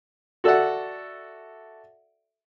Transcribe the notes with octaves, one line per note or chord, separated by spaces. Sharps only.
F#4 A4 D5 E5 F#5